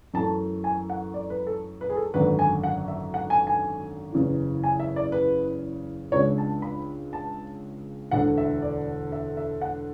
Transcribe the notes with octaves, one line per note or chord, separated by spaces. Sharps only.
F#2 E3 A3 A5
G#5
F#5
D5
B4
A4
B4
G#4
A4
G#1 F#2 D3 B4
G#5
F#5
E5
F#5
G#5
G#5
F#1 E2 C#3 E3
G#5
E5
D5
B4
C#2 C#3 G#3 D4 C#5
A5
B5
A5
E1 D2 D3 F#5
E5
D5
E5
E5
F#5